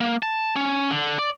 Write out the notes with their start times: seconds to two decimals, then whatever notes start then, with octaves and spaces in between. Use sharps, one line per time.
0.01 A#3
0.23 A5
0.56 C#4
0.90 D3
1.19 D5